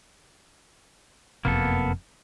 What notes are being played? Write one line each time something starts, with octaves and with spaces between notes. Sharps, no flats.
F#1 F2 C3 A#3 B3 A4